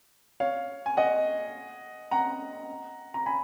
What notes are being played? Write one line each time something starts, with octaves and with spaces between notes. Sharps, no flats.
C#5 F5
G#5
D#5 F#5
F#5 A#5
A#5
G#5 B5